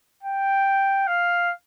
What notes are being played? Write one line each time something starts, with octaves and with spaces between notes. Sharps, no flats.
G5
F5